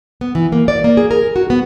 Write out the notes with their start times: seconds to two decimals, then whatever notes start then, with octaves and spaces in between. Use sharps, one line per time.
0.21 B3
0.35 E3
0.52 A#3
0.68 D5
0.84 A#3
0.97 G#4
1.11 A#4
1.36 F#4
1.50 B3